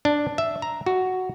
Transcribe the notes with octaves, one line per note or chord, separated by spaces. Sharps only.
D4
E5
A#5
F#4